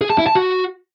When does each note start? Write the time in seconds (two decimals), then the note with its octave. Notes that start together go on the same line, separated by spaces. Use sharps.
0.01 G#4
0.10 A5
0.18 E4
0.27 A5
0.35 F#4